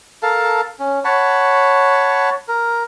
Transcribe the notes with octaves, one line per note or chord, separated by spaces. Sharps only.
A4 A#4 F5 A5
C#4
C#5 F#5 A5 B5
A#4